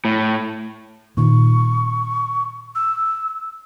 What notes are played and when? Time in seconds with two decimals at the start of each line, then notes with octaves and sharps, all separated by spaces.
0.05 A2
1.17 A#2 D#3 C#6
2.75 E6